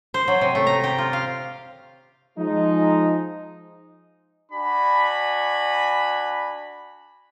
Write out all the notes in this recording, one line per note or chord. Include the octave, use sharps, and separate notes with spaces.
C5
F#3
C3
A3
A#5
G4
F4
F5
F3 G#3 D#4
D4 F#4 G#5 B5